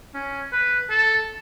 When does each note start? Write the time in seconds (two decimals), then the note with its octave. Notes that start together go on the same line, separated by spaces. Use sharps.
0.14 C#4
0.52 B4
0.90 A4